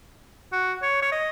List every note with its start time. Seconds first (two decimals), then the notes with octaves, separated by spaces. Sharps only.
0.52 F#4
0.83 C#5
1.02 C#5
1.12 D#5